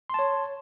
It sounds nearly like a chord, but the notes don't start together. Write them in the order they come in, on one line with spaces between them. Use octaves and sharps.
C6 A5 C#5